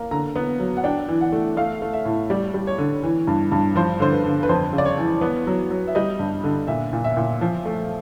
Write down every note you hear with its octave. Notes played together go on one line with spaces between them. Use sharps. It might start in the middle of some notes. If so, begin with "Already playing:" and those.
Already playing: A#3
D3 A#5
B3
F#3
F#5
D4 G5
E3
F#5
A3
A3 F5
A3
E5
A2
G3 D5
G3
C#5
D3
E3
G2
G2
F3 C5
D3 C5
B4
D3
B4
F2 C5
C#3
D5
C#5
E3
B3
F#3
F#3
E5
G3 D#5
G2
D3
A#2 E5
A#2
E5
A#2
F3
A3